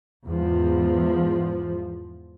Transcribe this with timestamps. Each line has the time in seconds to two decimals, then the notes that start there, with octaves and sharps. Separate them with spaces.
0.26 E2 G#2 F3